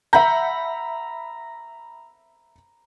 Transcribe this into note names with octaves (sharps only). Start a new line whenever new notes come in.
E5 F#5 A#5 B5 G6